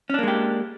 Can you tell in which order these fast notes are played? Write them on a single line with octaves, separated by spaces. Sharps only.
C#4 D4 A#3 G#3 G4